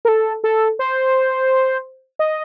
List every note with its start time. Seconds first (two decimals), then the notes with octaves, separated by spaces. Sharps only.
0.05 A#4
0.08 A4
0.44 A4
0.79 C5
2.19 D#5